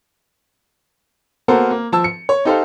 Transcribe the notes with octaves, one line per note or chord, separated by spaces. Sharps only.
A#3 B3 F#4 A4 A#4 C5
A#3
F3 A5 E6
C#7
C#5
D#4 G4 A4 C5 F5